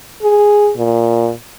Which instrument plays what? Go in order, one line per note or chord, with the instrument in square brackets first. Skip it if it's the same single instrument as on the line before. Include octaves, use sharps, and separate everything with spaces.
[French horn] G#4
A#2